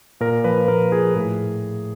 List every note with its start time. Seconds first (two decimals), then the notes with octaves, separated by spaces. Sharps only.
0.20 A#2 A#4
0.44 F3 B4
0.68 A#2 A#4
0.92 F3 G#4
1.15 A2 G#4